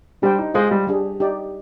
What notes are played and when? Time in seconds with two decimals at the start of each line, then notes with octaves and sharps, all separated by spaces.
0.22 G3 D4 G4 C5 G5
0.39 D#4
0.54 G#3 F4 C5 D#5
0.71 G3
0.87 G3 D4 G#4
1.20 D#4 G4 D5